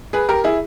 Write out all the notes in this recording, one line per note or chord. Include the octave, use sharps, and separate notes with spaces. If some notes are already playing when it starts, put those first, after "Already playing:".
G#4 B4
G4 A#4
E4 G#4